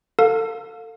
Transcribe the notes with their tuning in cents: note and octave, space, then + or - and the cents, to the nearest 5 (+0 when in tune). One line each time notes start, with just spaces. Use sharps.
A4 +30 F5 +25